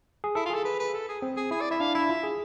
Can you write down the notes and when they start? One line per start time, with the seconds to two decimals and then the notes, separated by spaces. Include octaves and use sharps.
0.24 G#4
0.35 E4 A4
0.46 F4
0.50 G#4
0.54 A4
0.65 B4
0.79 B4
0.94 A4
1.08 G#4
1.22 C4
1.37 G#4
1.51 E4 G#4
1.61 D5
1.71 E4 E5
1.80 D4 F5
1.95 E4 E5
2.09 F4
2.23 G#4